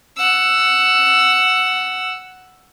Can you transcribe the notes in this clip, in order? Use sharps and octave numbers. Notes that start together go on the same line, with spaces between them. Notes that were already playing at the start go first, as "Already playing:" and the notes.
F#5 E6